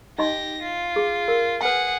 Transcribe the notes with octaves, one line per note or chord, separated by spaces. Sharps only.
D#4 G4 D#5 C6 A#6
F4
G#4
A#4
G#4 B4 F#5 G#5